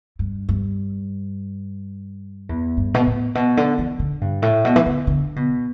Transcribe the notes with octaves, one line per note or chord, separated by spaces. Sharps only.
G2
G2
E2
G2
B2
A2
B2
D3
E3
D3
G2
A2
B2
E3
D3
D3
B2